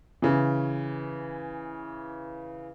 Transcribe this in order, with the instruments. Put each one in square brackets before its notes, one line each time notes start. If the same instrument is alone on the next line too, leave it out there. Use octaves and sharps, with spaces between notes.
[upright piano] C#3 E3